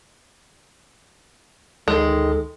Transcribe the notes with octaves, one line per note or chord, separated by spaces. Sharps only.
D2 D#3 G#3 A4